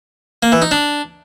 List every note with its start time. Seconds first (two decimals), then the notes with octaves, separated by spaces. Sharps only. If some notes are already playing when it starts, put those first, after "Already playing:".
0.43 A#3
0.52 E3
0.62 D#4
0.71 D4